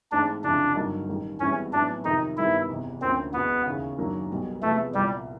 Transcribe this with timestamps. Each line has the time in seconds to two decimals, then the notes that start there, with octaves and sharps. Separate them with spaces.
0.12 G#2 E3 A3 C4 D4
0.43 F1 F2 C#3 E3 D4
0.76 G2 D3 F#3 A#3 D#4
1.09 A1 G2 D#3 G3
1.40 G#1 G#2 E3 G3 B3 C#4
1.73 A2 F#3 B3 D4 E4
2.05 F2 C3 D#3 D#4
2.37 G2 D#3 G3 B3 E4
2.69 F1 E2 C3
3.01 D2 D3 F3 A#3 C4 C#4
3.33 E1 E2 B2 B3
3.66 D#2 C#3 E3
3.98 F#2 D#3 F#3 A#3 D4
4.30 B1 B2 G3
4.62 E2 C3 F3 G#3 A3 B3
4.94 C2 A#2 F3 G3